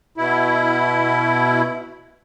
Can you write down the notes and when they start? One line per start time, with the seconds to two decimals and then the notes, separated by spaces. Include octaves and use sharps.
0.17 B2 E4